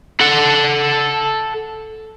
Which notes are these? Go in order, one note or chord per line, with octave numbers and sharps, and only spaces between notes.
A4 F#5